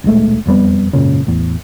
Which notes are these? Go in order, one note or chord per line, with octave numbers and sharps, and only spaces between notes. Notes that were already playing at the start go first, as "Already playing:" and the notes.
D#1 B1 G#3 A3
E1 F2 G3 B3
G#1 F#2 A#2 C#3
A1 E2